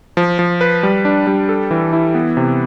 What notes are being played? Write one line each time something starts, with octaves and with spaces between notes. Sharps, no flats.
F3
F3
B4
G3
D4
G3
A4
E3
E4
B3
C3